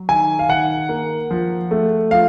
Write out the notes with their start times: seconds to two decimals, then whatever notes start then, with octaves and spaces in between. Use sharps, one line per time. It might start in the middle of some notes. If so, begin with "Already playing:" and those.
Already playing: F#3
0.09 D#3 G#5
0.39 F5
0.49 D#3 F#5
0.89 A#3
1.31 F3
1.71 A3
2.11 F3 F5